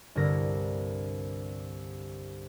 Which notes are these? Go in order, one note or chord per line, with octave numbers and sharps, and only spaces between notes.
C2 G2 D3 A#4 A#6